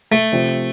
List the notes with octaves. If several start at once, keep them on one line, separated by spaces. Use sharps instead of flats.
A3
C3 F3 C4